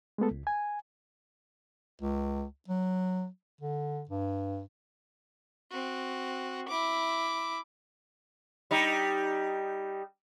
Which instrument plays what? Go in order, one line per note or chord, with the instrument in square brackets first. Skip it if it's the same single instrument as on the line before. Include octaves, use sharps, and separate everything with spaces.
[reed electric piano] G#3 A3 B3 A4
C#2
G#5
[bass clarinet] C#2
F#3
D3
G2
[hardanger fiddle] C4 F#4
E4 D6
[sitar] G3 D#4